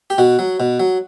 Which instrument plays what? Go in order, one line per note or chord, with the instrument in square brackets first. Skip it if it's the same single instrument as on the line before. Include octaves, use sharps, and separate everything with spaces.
[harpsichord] G4
B2 F#4
F#3
B2
F#3